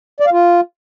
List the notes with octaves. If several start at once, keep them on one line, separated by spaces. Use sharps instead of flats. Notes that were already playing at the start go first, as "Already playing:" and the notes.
D5
F5
F4